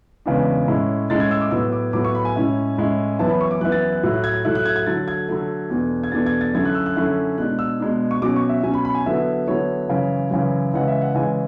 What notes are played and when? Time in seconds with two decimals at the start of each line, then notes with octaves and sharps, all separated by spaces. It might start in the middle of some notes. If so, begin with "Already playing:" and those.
0.26 E2 C#3 E3 G#3 D4
0.68 A2 G#3 C#4 E4
1.10 A2 G#3 C#4 E4 A6
1.20 G#6
1.31 E6
1.41 D6
1.51 A2 F#3 B3 E6
1.72 D6
1.93 A2 F#3 B3 D6
2.05 C#6
2.15 B5
2.25 G#5
2.36 A2 G#3 C#4 E4
2.78 A2 G#3 C#4 E4
3.19 F#2 E3 B3 E4 A5
3.29 B5
3.41 C#6
3.51 D6
3.61 F#2 E3 B3 E4 F#6
3.72 A6
3.92 F#6
4.03 A2 F#3 A3 E4
4.14 F#6
4.24 G#6
4.34 G#6
4.45 A2 F#3 A3 E4 F#6
4.55 F#6
4.66 G#6
4.76 G#6
4.86 D3 F#3 A3 A6
5.08 G#6
5.29 D3 F#3 A3
5.70 E2 B2 A3 D4
6.04 G#6
6.12 E2 B2 A3 D4 A6
6.26 G#6
6.41 A6
6.54 F#2 D3 A3 C#4 E4 G#6
6.65 F#6
6.75 E6
6.86 F#6
6.96 F#2 D3 A3 C#4 E4
7.38 B2 G#3 D4 F#6
7.59 E6
7.80 B2 G#3 D4
8.11 C#6
8.22 B2 F#3 C#4 D6
8.36 C#6
8.49 E5
8.63 B2 F#3 C#4 G#5
8.74 B5
8.85 B5
8.95 G#5
9.06 D3 F#3 B3 E4 E5
9.48 D3 F#3 B3 E4 C#5
9.89 F#2 C#3 E3
10.31 F#2 C#3 E3
10.74 C#3 E3 G#3 F#5
10.88 E5
11.02 F#5
11.14 C#3 E3 G#3 G#5